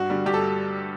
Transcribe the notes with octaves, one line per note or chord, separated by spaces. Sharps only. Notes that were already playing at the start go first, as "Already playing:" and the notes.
Already playing: G2 F#4
D3 G3
G2 G4
A4